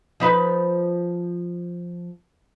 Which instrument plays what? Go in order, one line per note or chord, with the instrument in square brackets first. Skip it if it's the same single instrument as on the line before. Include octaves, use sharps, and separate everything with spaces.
[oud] F3 D#4 B4